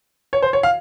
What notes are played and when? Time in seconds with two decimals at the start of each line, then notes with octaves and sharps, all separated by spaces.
0.33 C#5
0.42 C5
0.53 C#5
0.63 F5